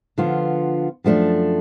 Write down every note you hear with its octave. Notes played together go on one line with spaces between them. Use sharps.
D3 F3 B3 F4
F#2 F3 A3 D4